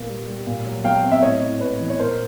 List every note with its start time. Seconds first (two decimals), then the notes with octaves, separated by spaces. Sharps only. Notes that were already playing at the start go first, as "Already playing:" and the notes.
Already playing: A#2 A#3 B3
0.09 G3
0.28 G3
0.46 A#2
0.66 F#3
0.84 F#3 F5 G5
1.03 C4
1.12 E5
1.22 A2 C#5 D#5
1.42 A2
1.60 A2 B4 C#5
1.80 E3
1.90 C#5
1.99 A#2 A#4 C5